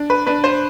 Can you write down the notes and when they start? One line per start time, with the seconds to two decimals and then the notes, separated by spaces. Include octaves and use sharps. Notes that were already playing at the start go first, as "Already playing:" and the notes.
Already playing: D4
0.10 B4
0.26 D4 B4
0.44 C5